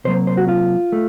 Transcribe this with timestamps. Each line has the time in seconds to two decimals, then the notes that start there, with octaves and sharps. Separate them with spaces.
0.04 C3 F#3 A#3 C5
0.27 C5
0.37 F#4
0.48 F4
0.92 A3